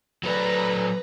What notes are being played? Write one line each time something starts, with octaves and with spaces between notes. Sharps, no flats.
F#3 A4 B4 D5 A#5